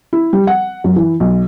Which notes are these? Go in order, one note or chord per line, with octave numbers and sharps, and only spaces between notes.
E4
G3
F#5
F#2
E3
B1